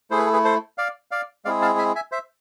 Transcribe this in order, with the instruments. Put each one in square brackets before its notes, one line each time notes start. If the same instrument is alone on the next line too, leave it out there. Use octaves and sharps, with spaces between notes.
[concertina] A3 E4 G#4 C5
B4
A4
G#4 B4
A4 C5
D5 F5
D5 F5
G#3 C4 E4 G#4 D5 F5
F5 A5
E5 G#5
E5 G#5
C5 E5